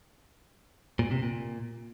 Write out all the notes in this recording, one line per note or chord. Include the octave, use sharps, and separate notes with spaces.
A#2
C3
A#2